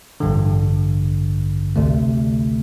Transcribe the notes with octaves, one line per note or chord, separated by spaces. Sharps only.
A1 G2 D3
D2 C3 A3